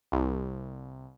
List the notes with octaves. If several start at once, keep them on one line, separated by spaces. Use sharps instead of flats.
C2